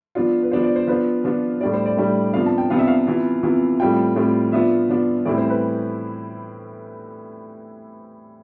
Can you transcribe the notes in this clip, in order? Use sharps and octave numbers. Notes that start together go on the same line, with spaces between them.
F3 B3 D4 F4
B4
F3 B3 D4 F4 C5
D5
C5
F3 B3 D4 F4 B4
F3 B3 D4 F4
A2 G3 D4 D5
C5
D5
A2 G3 D4
C3 F3 B3 D4 F5
A5
G5
C3 F3 B3 D4 F5
E5
F5
C3 E3 B3 F4
C3 E3 B3 F4
A2 G3 C4 F4 G5
A2 G3 C4 F4
F3 B3 D4 F4 E5
F3 B3 D4 F4
A2 E3 G3 C4 E4 D5
C5
B4